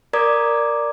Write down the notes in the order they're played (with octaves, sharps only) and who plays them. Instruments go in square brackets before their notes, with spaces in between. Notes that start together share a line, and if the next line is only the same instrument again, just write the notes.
[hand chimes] A#4 D5 A#5 D6 D#6 G#6